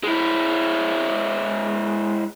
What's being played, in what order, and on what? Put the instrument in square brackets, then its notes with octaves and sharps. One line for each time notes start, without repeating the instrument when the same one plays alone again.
[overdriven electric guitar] G#3 E4